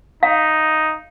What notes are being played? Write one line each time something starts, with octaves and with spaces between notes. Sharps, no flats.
D#4 F5